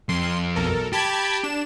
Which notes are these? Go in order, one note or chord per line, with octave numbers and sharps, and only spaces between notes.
F2 C6
B1 A4 A#4
G4 A5 B5 G#6
D4 E7